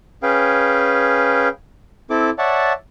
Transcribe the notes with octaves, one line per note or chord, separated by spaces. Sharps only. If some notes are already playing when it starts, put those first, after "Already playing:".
C#4 G#4 B4 F5 G5
C4 E4 A4 D6
C#5 D5 E5 F#5 A5